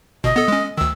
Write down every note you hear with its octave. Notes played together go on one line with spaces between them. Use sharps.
G1 B2 D#5
B3 A4
G#3 C#4
D2 D#3 E6